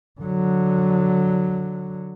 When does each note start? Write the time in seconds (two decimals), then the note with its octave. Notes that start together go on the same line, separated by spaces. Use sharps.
0.21 D3 F#3